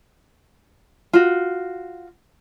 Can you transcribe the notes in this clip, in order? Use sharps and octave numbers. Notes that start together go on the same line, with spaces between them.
F4 F#4